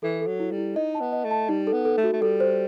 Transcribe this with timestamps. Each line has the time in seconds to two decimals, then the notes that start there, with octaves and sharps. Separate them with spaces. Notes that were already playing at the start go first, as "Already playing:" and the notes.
0.03 E3 A4
0.21 A4
0.27 F#3
0.40 E4
0.51 G3
0.58 E4
0.76 D#4 D#5
0.95 A5
1.00 B3
1.12 D#5
1.24 A3
1.31 A5
1.49 G3 D#4
1.67 A4
1.73 B3
1.85 A4
1.97 A3
2.04 F#4
2.13 A3
2.22 G3 A4
2.40 C5